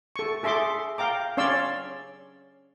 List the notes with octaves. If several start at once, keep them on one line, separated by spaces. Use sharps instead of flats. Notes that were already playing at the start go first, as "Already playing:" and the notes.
A4 C#6
G#4 A4 E5 C6 D6
F5 G5 A#5 D6
C#4 C#5 D5 F5 C6 E6